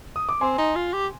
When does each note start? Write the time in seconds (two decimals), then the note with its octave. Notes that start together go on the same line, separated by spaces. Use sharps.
0.16 D#6
0.29 D6
0.41 C4 G#5 C6
0.58 D#4
0.76 F4
0.93 G4